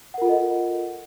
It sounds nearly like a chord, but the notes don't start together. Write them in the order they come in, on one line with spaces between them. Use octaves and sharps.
F#5 A#4 F4 A4 D#5